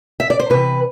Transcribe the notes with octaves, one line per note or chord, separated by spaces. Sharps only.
E5
D5
C5
C3 E3 B4